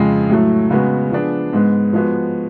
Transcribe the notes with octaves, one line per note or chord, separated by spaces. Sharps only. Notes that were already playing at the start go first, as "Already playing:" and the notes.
Already playing: F2 C#3 G#3
A2 F#3 A3
C#3 G#3 B3 F#4
F3 B3 D4 G#4
G#2 G#3 B3
F3 G#3 B3 F#4